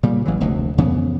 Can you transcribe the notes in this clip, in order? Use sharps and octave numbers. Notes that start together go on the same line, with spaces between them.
A#2 C#3 G3
A1 E3 F#3
F1 D2 B2
F2 C#3 E3 B3